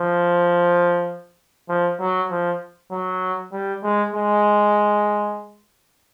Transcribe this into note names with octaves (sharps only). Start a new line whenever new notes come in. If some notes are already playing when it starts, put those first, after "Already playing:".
Already playing: F3
F3
F#3
F3
F#3
G3
G#3
G#3